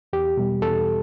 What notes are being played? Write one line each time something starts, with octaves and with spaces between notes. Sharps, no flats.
E2 G4
B2 G3
E2 A4